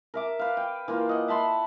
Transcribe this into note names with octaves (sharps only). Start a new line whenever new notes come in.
A#4 E5 D6
B4 F5
G5
E3 A#3 F4
D#5 F#5
E5 A5 B5 C6